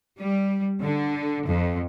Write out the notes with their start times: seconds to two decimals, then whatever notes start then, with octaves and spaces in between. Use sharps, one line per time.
0.18 G3
0.81 D3
1.47 F2